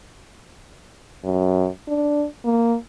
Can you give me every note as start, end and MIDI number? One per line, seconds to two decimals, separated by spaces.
1.24 1.67 42
1.88 2.25 62
2.45 2.76 58